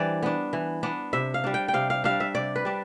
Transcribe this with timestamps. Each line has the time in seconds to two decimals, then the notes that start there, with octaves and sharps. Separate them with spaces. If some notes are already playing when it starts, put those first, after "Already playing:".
Already playing: E3 G3 D4 C5 D5
0.23 B3 D4
0.53 E3
0.83 B3 D4
1.13 C3 E5
1.34 F5
1.44 G3 D4
1.54 G5
1.68 G5
1.74 C3 F5
1.90 F5
2.04 G3 D4 F5
2.20 E5
2.35 C3 D5
2.56 B4
2.65 G3 D4